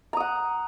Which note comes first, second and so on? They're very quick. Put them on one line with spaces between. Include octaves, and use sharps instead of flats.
A#5 D#6 F#5